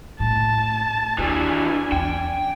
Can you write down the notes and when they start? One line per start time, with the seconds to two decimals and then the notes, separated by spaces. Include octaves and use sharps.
0.20 A2 A5
1.18 D#2 E3 G3 D4 G#5
1.92 E2 C#4 G5